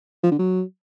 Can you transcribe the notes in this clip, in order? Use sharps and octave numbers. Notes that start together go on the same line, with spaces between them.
F3
D3
F#3